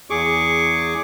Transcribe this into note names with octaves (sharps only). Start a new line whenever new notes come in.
E2 G#4 C#6 D6